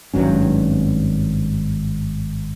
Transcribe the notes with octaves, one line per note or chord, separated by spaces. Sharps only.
G#1 G2 F#3 C#4